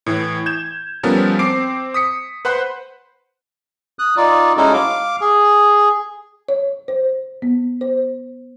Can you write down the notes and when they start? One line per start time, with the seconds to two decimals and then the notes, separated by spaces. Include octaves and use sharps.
0.06 A2 E3
0.46 G6 G#6 E7
1.03 F3 G3 B3 C#4 A4 A#4
1.39 C4 D6 C7 D7
1.94 D#6 B6 C#7
2.45 B4 C5 F#5 B5 C6
3.99 D#6 F#6
4.17 D#4 F4 D5
4.57 G#3 C#4 D#4 E4 F#4 A4
4.73 F5 D6
5.21 G#4
6.49 C#5
6.88 C5
7.42 B3
7.81 C5